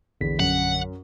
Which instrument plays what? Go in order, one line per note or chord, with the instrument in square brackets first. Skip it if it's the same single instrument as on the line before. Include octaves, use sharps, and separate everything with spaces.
[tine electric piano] A#1 D3 B6 [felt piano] E2
[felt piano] F#2 [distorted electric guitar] F#5